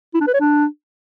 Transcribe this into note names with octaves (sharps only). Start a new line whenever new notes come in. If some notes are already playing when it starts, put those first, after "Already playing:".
E4
D4
B4
C#5
D4